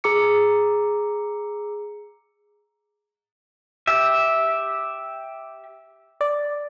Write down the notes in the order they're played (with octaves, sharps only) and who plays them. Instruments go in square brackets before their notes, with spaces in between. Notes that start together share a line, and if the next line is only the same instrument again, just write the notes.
[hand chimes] G#4 A#5 D6 E6 C#7
[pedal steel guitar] G4 E5
[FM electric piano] D5